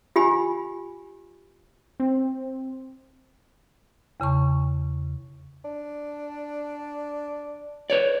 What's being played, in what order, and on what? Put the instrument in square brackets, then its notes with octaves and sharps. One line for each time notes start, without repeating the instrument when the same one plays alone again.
[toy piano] F4 G4 G#5 B5
[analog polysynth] C4
[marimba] E2 C#3 A5 C#6
[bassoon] D4
[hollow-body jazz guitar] B4 C#5 D5